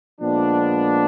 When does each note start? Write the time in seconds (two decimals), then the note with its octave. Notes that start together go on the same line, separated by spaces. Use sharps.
0.21 A#2 F3 G#3 B3 D4